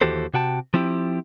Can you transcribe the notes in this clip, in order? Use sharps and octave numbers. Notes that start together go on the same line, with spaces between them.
D#2 E3 F#4 G4 A4 C5
C3 F#4 G5 A5
F3 C4 E4 G4